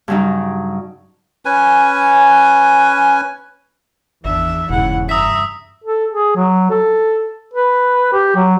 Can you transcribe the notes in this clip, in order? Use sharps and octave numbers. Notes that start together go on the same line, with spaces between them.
G2 C#3 F#3 G3 D#4
C#4 B4 G#5
G#1 E2 D4 E5
F1 E2 G#2 C#3 E4 F#5
G2 E5 A#5 D#6 B6
A4
G#4
F#3
A4
B4
G4
F#3